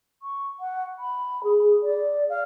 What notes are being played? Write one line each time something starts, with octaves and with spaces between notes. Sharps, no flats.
C#6
F#5
B5
G#4
D5
F5